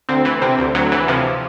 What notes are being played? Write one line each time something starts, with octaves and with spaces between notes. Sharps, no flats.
D2 C4
E3
C3 C4
D2
D2 F#3
E3
C3 F3